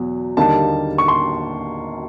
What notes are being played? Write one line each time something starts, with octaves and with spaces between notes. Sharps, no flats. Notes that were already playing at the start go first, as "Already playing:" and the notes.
Already playing: E2 B2 F#3
D#2 D3 G3 A#3 D#4 A5
C#6
C6